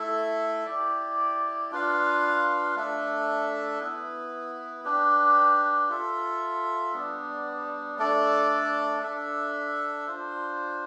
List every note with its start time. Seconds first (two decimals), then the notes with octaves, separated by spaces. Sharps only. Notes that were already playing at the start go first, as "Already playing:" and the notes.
Already playing: A3 E4 A4 E5
0.66 E4 G4 D5
1.72 D4 F4 B4 F5
2.76 A3 D4 A4 E5
3.80 B3 E4 B4
4.85 D4 G4 B4
5.89 F4 A4 E5
6.93 G3 B3 D4
7.99 A3 D4 A4 D5
9.03 D4 A4 E5
10.07 D4 F4 C5